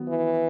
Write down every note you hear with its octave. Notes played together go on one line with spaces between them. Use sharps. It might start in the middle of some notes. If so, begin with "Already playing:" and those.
Already playing: D#3 F#3 B3
E3